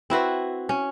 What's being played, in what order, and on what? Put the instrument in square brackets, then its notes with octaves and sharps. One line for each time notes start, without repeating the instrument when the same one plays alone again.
[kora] C4 E4 F#4 B4
C#4